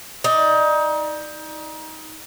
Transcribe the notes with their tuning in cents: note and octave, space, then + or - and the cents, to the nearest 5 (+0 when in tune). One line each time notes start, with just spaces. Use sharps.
D#4 +25 D5 +30